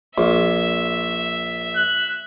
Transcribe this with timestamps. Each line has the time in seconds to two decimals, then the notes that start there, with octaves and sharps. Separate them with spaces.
0.18 A#1 E5
1.76 F#6